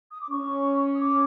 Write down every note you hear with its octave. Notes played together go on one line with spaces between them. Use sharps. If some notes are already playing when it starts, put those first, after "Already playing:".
D#6
D6
C#4 C#6
D#6
D6